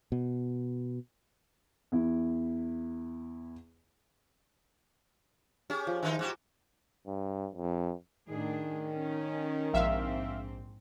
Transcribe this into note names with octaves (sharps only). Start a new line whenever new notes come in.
B2
E2 E4
C#4 G4 G#4
F3
D#3 D#4 F4
G#2 F#4 G4 F#5
G2
F2
A2 D#3 D4 G#4
C#4
A#1 G#2 C4 E5 F5